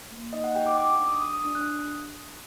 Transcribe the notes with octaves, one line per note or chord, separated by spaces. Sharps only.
A#3
D#4 D#5
F#5
G4 G5
D6
G4 D6
D4
D#6
G4 D#6
D#6
D4 D#6
F#6